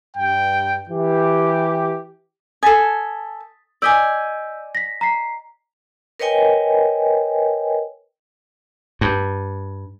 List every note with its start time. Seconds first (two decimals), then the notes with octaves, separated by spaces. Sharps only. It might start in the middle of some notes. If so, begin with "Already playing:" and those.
0.17 G2 G5
0.90 E3 G4
2.63 A4 G#5 D#6 A6 B6
3.82 D5 D#5 G#5 E6 G6 B6
4.75 A#6 B6
5.01 A#5 B6 C7
6.20 A#4 B4 C#5 D#5 G5 G#5
9.01 G2